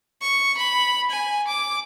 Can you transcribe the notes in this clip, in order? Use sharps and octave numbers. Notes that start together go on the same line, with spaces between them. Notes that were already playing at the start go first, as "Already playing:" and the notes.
C#6
B5
G#5
D6